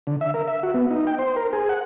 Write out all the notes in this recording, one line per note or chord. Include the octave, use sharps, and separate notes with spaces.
D3
E5
A#4
E5
F#4
B3
D#4
G5
C5
A#4
G#4
F#5